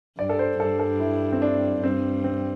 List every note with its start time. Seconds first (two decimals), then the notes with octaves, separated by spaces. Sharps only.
0.18 G2 D5
0.29 A4
0.39 C5
0.60 G2 A4
0.79 A4
1.00 E4
1.32 C4
1.42 D4
1.83 G2 C4
2.24 C4